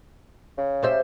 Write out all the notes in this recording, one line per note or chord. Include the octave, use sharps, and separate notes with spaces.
C#3
G3 C5 E5